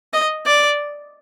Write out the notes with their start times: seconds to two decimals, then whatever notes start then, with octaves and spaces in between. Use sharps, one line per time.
0.13 D#5
0.46 D5